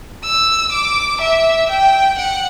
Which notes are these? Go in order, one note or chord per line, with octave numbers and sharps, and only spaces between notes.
E6
D6
E5
G5
F#5